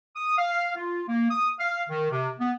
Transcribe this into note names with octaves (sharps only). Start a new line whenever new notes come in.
D#6
F5
F4
A#3
D#6
F5
D#3
C3
B3